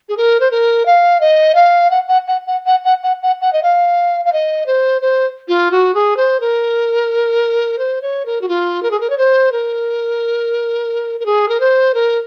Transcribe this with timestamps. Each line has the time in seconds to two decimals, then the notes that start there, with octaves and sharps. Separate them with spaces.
0.09 G#4
0.17 A#4
0.40 C5
0.51 A#4
0.86 F5
1.21 D#5
1.55 F5
1.90 F#5
2.09 F#5
2.28 F#5
2.47 F#5
2.66 F#5
2.85 F#5
3.03 F#5
3.22 F#5
3.41 F#5
3.53 D#5
3.63 F5
4.25 F5
4.33 D#5
4.67 C5
5.02 C5
5.48 F4
5.71 F#4
5.94 G#4
6.17 C5
6.40 A#4
7.78 C5
8.02 C#5
8.26 A#4
8.41 F#4
8.48 F4
8.83 A#4
8.91 G#4
9.00 A#4
9.10 C#5
9.18 C5
9.52 A#4
11.20 A#4
11.26 G#4
11.49 A#4
11.60 C5
11.94 A#4